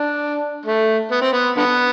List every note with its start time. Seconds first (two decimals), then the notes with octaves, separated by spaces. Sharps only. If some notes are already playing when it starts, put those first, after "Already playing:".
Already playing: D4
0.66 A3
1.11 B3
1.22 C4
1.33 B3
1.57 D3 B3